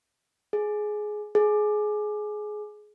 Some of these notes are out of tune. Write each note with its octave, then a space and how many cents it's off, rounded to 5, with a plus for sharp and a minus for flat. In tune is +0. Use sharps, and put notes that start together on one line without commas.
G#4 +15
G#4 +20